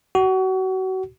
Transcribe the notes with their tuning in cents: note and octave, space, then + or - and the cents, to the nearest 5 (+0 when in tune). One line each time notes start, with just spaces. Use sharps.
F#4 +30